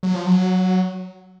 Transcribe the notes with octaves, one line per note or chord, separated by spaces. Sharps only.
F#3
F3
F#3